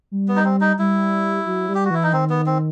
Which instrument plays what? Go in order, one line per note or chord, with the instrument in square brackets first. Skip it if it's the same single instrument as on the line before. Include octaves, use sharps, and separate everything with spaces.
[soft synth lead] G3
[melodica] B3
D#4
C4
D#4
[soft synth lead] G3 [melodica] E4
[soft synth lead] F#3
G3
[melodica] G4
F#4
[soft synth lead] E3 [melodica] E4
[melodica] D#4
[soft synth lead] D#3 [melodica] C4
[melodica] B3
C4